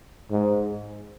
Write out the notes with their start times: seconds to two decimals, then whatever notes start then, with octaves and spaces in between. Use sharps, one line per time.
0.31 G#2